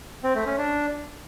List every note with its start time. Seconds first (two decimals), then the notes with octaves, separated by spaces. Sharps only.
0.23 C4
0.35 A3
0.46 C#4
0.58 D4